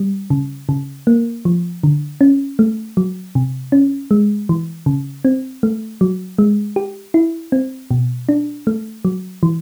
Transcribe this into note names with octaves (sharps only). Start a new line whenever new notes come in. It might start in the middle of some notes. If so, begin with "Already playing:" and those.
Already playing: G3
C#3
C#3
A#3
F3
D3
C#4
A3
F#3
C3
C#4
G#3
E3
C#3
C4
A3
F#3
G#3
G4
E4
C4
B2
D4
A3
F#3
E3